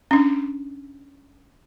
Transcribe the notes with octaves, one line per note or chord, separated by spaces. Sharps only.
C#4 D4